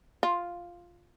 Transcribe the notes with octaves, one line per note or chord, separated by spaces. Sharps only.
F4